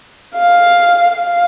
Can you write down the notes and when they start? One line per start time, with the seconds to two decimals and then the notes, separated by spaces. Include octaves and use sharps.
0.37 F5
1.15 F5